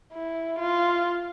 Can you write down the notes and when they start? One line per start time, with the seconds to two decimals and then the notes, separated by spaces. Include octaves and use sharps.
0.14 E4
0.59 F4